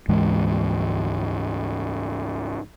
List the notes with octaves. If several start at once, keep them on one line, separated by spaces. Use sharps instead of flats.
D2 G#2 E3 G#3